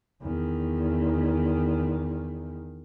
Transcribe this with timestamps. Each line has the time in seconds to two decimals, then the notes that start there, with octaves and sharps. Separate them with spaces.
0.21 E2 D#3